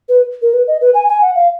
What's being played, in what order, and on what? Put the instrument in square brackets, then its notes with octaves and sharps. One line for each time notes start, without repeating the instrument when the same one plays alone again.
[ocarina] B4
A#4
B4
D#5
B4
G#5
G#5
F#5
F5